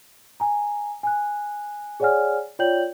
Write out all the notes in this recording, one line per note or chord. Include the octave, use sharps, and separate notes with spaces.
G#5 A#5
G#5 F#6
G#4 C#5 D5 F#5 G#5 F6
F4 C#5 D5 G5 G6 F#7